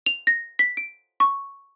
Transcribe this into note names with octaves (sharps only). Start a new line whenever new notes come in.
F7
A#6
B6
D7
C#6